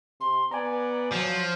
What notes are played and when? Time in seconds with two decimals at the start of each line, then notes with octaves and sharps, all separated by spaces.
0.20 C3 C6
0.51 B3 D5 G#5 A#5
1.12 F3 F#3